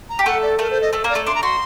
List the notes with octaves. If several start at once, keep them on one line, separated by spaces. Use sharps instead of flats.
A#5
G4
A3 A4 F#5
D5
A3 A4 A#4
C5
D#5
A3 A4
A#3 A#4
D5
A3 A4
D4 C6
A#5
F#4 C6